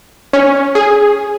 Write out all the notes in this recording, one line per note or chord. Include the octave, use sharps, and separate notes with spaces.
C#4
G#4